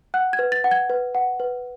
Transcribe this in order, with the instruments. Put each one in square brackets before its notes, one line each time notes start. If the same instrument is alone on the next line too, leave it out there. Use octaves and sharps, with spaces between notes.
[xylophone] F#5 F#6
G#6
B4
A6
F#5
G#6
B4
F#5
B4